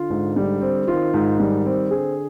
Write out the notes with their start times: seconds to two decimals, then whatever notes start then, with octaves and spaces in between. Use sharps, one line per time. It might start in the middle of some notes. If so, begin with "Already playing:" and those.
Already playing: D3 F4
0.10 G#2
0.36 G3
0.62 C4
0.88 D#3 F4
1.14 G#2
1.40 G3
1.65 C4
1.91 D3 G#4